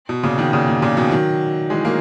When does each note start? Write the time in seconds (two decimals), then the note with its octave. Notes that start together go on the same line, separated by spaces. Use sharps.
0.09 B2
0.23 A#2 C#3
0.38 B2 D#3
0.53 A#2 C#3
0.68 A#2
0.82 A#2 C#3
0.97 B2 D#3
1.11 D#3 F#3
1.70 E3 G#3
1.85 F#3 A#3